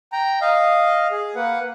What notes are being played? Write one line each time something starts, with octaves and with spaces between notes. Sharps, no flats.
G5 A#5
D#5 F5
G#4
A#3 B4 F#5